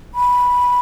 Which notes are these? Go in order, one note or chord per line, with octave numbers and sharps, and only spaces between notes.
B5